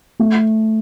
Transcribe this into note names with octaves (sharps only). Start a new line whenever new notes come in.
A3